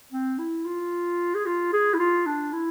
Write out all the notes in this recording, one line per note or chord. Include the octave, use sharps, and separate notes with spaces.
C4
E4
F4
G#4
F4
G#4
E4
F4
D4
E4